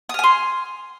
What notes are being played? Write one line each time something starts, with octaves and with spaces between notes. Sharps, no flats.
G#5 C6 D#6 F6